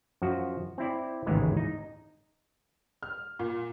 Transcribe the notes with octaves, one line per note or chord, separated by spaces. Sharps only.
F#2 F3 F#4
C4 E4 D5
A1 D#2 G#2 C#3 E3 G#3
D#4
F6
A#2